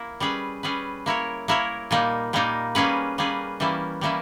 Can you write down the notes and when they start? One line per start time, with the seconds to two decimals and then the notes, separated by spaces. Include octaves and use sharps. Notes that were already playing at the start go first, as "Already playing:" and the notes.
Already playing: A#3 E4
0.20 G3 C#4 G#4 B4
0.63 G3 C#4 G#4 B4
1.06 A#3 E4 A#4 C#5
1.48 A#3 E4 A#4 C#5
1.91 A#2 G3 A#3 D#4
2.33 A#2 G3 A#3 D#4
2.75 G3 A#3 C#4 G#4 B4
3.18 G3 A#3 C#4 G#4 B4
3.60 E3 G3 A#3 C#4 E4
4.01 E3 G3 A#3 C#4 E4